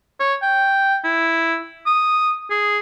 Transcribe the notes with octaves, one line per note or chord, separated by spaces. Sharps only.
C#5
G5
E4
D#6
G#4